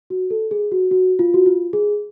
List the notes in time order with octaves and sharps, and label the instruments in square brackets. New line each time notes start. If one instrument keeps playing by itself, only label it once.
[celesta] F#4
A4
G#4
F#4
F#4
F4
F#4
F4
G#4